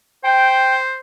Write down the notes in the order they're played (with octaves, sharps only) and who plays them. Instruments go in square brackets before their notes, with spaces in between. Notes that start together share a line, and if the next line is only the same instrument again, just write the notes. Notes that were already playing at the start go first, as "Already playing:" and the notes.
[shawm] C5 [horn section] G5